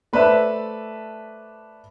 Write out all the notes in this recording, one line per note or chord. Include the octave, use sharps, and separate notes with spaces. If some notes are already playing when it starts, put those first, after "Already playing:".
A3 B4 C5 D5 E5 A5